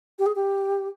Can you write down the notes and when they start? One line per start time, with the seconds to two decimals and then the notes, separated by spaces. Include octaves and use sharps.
0.19 G4
0.26 G#4
0.36 G4